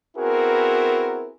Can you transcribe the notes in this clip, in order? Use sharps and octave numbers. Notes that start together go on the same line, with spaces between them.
B3 C4 E4 F#4 G#4 A#4